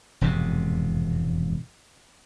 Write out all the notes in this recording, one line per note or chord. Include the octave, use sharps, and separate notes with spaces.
E1 F2 G#2 C3